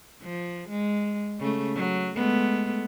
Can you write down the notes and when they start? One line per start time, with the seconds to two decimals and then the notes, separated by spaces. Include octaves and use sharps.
0.23 F3
0.69 G#3
1.39 C#3 A3
1.76 F#3
2.16 G#3 A3 B3